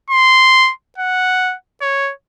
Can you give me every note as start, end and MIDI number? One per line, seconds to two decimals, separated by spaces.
0.10 0.72 84
0.98 1.55 78
1.82 2.12 73